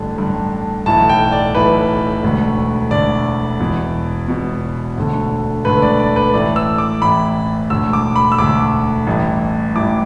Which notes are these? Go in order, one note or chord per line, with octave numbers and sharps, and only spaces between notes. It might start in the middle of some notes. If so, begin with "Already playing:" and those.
Already playing: A1 G2 D3
A1 G2 D3
B1 A2 E3 A5
G5
D5
B1 A2 E3 B4
E1 D2 D3
E1 D2 D3 D5
E1 E2 B2
E1 E2 B2
E1 D2 D3
E1 D2 D3 B4
D5
D5
B4
A1 A2 E3 D5
E6
D6
A1 A2 E3 B5
E1 D2 D3 E6
D6
B5
E6
E1 D2 D3 D6
A1 G2 E3
A1 G2 E3 D6